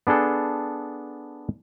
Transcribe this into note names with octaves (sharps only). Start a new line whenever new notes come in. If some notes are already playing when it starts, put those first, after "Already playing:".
B3 D4 G#4 A4